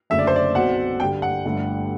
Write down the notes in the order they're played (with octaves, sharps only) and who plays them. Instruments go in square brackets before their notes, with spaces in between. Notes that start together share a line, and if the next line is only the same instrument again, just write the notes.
[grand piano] F#1 F#2 D3 A3 [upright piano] E5
[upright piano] D5
C5
D5
[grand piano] B1 B2 F#3 C4 [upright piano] F#5
[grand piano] G2 D3 G3 [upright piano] G5
[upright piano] F#5
[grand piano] G1 G2 D3 A3